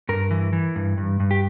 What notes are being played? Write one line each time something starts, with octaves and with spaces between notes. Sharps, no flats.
G2 A#4
E3
E3
G2
G2
G2
G4